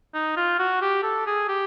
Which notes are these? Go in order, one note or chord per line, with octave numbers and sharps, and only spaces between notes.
D#4
F4
F#4
G4
A4
G#4
G4